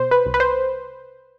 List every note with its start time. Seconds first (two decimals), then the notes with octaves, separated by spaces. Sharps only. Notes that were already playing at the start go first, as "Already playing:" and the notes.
Already playing: B2 C5
0.11 B4
0.26 C2
0.34 B4
0.40 C5